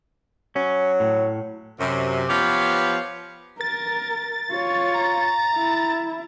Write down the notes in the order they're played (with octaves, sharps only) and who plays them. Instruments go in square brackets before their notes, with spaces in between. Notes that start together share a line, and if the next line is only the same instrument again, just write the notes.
[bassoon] F#3 [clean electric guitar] C#4
[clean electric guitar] A2
[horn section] F#2 C3
F3 B3 G4 B4 C#5 F5
[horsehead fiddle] A#4 [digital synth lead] A6
[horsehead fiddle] F4 C#5
[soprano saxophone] A#5
[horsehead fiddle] E4